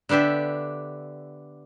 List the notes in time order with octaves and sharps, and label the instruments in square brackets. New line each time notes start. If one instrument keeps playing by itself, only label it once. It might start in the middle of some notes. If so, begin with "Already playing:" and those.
[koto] D3 B3 D4 G4 E5